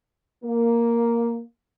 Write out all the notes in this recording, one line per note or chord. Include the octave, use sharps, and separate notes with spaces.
A#3